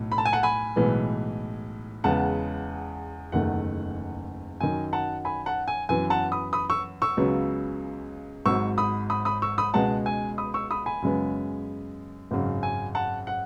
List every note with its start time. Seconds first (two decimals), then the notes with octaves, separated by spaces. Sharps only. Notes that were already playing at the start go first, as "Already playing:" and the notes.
Already playing: B1 A2
0.12 B5
0.18 A5
0.26 G#5
0.33 F#5 A5
0.43 G#5 B5
0.76 B1 A2 E3 G#3 B3
2.04 E2 C#3 G#3 B3 F#5 A5
3.32 F#1 E2 D#3 A3 F#5
4.60 F#2 D#3 F#3 G#5
4.93 F#5 A5
5.25 G#5 B5
5.46 F#5 A5
5.68 G#5
5.89 F#2 E3 B3 G#5
6.10 F#5 A5
6.32 B5 D#6
6.53 B5 D#6
6.70 C#6 E6
7.02 C#6 E6
7.17 C#2 C#3 F#3 B3
8.46 G#1 G#2 F#3 C#6 E6
8.78 B5 D#6
9.10 B5 D#6
9.25 B5 D#6
9.42 C#6 E6
9.58 B5 D#6
9.74 C#2 B2 G#3 B3 F#5 A5
10.06 G#5
10.38 B5 D#6
10.54 C#6 E6
10.71 B5 D#6
10.86 G#5 B5
11.02 F#2 C#3 G#3 B3
12.31 G#1 F#2 C#3
12.63 G#5
12.95 F#5 A5
13.27 F#5